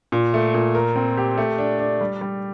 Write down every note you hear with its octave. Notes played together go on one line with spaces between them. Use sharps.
A#2
A3
A#2
A#4
C4
G4
A3
D4
D4
G3
G3